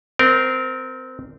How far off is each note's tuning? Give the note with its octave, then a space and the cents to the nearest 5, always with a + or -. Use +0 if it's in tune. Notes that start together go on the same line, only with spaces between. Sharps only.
C4 -20 A#4 +0